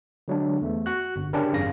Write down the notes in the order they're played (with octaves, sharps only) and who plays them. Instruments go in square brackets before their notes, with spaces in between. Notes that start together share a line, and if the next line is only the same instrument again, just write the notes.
[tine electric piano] D3 F#3 G#3 D4
E2 A3
F#4 F#6
G1
C#3 C#4 D4 G4 A#4
G#1 F#2 C#3 F5 A#6